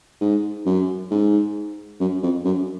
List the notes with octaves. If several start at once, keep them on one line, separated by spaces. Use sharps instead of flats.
G#2
F#2
G#2
F#2
F2
F#2